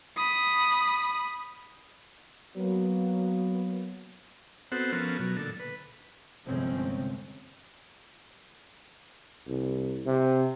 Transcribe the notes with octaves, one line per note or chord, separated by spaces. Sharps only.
B5 D#6
F#3 A#3 B3
B3 C4 F#4 A4 C5 F#5
F3 B3 C#4 A4 A#4
B2 F#3
A#2 D3 A4
B4
G1 C3 F3 G#3 C4 C#4
C2
C3